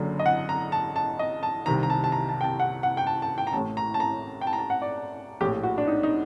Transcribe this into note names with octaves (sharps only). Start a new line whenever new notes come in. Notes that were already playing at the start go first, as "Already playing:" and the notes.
Already playing: F#1 F#2 D3
D#5
F#5
A#5
A5
A5
D#5
A5
C2 C3 D#3 A#5
A#5
A5
A5
A#5
A5
G5
A5
F#5
F#5
G5
A5
A5
G5
A#5
A1 A2 A5
A#5
A5
A#5
G5
A5
A#5
A5
F#5
D5
A#1 A2 G4
F#4
D4
D#4
D#4